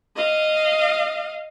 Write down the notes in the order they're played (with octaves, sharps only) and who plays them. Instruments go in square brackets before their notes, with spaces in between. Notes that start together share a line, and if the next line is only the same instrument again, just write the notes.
[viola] D#5 F5